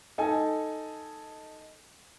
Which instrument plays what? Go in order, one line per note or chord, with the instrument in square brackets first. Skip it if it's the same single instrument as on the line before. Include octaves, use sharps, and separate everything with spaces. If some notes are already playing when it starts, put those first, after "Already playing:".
[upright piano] D#4 A4 G#5